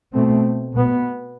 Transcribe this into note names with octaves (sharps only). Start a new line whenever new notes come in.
B2 A3 C4
B2 B3